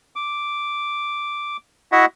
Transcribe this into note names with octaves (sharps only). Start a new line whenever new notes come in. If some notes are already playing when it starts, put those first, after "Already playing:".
D6
E4 F#4 D#5 E5 F#5